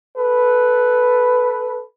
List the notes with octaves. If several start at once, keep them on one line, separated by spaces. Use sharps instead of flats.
A4 B4